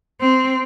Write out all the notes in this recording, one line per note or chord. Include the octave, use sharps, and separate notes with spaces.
C4